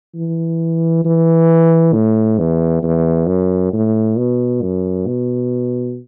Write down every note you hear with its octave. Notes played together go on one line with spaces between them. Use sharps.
E3
E3
A2
E2
E2
F#2
A2
B2
F#2
B2